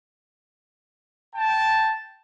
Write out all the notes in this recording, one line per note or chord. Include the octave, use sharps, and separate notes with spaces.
G5 A5